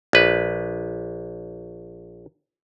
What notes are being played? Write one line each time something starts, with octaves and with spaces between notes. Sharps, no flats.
A#1 B4